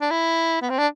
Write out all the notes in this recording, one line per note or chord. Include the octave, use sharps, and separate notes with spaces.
D4
E4
B3
C4
D4